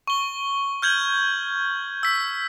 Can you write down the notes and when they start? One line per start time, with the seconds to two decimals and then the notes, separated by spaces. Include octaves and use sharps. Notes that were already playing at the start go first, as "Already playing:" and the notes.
0.07 C#6 G7
0.82 F6 G6 G#6 F#7
2.03 E6 B6